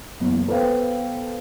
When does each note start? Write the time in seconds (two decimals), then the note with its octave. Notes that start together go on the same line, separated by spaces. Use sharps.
0.20 F#1 E2
0.47 B3 A4 B4 C5 F5 G5